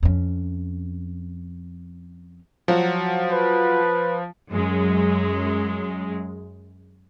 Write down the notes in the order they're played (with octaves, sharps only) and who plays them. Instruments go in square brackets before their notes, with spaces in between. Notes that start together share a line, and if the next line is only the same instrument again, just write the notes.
[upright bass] F2 C#4
[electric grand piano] F3 [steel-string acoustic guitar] F#3 F4 F#4
[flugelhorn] B4
[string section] F#2 G#3